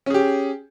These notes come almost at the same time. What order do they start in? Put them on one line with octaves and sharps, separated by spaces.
C#4 G#4 G4